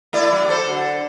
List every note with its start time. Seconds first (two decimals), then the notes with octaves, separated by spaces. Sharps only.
0.13 A3 E4 D5
0.33 F#3
0.49 A4 C5
0.66 D3